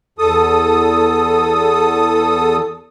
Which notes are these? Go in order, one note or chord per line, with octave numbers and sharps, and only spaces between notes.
E2 A4 D#6